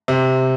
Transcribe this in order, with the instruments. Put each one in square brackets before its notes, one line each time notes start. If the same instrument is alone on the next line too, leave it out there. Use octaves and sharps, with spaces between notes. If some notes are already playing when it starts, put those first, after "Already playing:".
[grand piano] C3